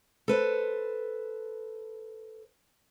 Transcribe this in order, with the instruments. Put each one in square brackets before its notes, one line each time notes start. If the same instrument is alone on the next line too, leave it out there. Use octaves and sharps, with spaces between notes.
[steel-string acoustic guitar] A4 B4 C5